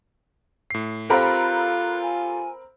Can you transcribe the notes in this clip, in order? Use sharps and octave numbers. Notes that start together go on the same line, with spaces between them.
A2 C7
C4 F4 G4 A4 A#4 F5 B5 F#6
G#5